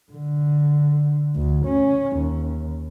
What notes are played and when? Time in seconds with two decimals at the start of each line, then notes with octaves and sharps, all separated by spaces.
0.12 D3
1.36 D2
1.66 C#4
2.17 D#2